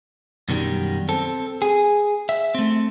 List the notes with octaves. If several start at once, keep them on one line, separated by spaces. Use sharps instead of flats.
F#2 B2 D#3 G3
C4 A4
G#4
E5
A3 C4